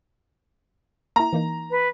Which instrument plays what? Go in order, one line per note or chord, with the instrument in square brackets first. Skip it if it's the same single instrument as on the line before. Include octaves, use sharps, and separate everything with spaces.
[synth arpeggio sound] A#3 E4 [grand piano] A#5
[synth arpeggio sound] E3 A#3 D#4
[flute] B4